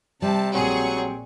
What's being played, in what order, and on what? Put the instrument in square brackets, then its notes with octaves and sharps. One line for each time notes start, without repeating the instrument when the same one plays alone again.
[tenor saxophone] C3 [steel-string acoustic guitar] G3 [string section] A5
[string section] A#1 G#4 C#6 [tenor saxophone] F#3 [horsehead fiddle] C4